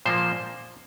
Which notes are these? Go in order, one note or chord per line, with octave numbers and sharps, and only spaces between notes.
A#2 F3 A#3 C5